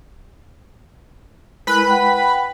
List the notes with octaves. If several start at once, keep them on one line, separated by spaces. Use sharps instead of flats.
G#3 E4 A#4 B4 B5
F#5 G5